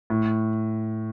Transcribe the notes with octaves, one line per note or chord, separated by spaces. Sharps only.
A2